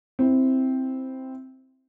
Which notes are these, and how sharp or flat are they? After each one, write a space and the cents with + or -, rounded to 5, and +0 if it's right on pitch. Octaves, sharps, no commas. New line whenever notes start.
C4 +0 E4 +0